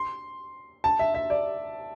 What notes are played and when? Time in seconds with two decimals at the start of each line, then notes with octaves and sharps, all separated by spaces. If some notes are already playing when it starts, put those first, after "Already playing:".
Already playing: C6
0.84 A5
0.99 E5
1.15 E5
1.30 D5